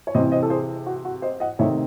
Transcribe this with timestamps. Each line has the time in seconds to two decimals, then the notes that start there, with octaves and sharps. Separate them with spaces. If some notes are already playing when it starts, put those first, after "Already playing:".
0.07 C#5
0.15 C3 E3 C4 C5 D#5
0.32 C5 D#5
0.43 A4
0.50 G#4 C5
0.86 F#4
1.05 F#4
1.22 C5 D#5
1.40 D#5 F#5
1.59 C3 D#3 A3 C4 D#4 C#5 E5